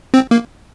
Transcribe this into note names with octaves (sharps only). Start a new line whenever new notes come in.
C4
A#3